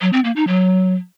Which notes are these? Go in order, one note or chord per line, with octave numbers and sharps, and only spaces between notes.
F#3
C4
A#3
D#4
F#3